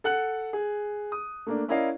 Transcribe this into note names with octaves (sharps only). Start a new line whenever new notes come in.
A4 F#5 F#6 F#7
G#4
D#6
A3 A#3 D4
C#4 E4 A#4 D5 D#5 F5